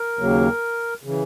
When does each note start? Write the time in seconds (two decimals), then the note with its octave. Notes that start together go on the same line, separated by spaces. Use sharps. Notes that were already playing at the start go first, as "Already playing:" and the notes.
Already playing: A#4
0.19 D#2 C#3 F#3 A#3
1.03 C#3 E3